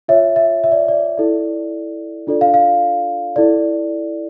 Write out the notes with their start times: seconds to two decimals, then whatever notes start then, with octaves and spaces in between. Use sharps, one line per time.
0.08 F4 C#5 E5
0.36 E5
0.64 E5
0.72 D5
0.88 D5
1.18 E4 A4 D5
2.27 D4 F4 A4 D5
2.41 F5
2.54 F5
3.36 E4 A4 D5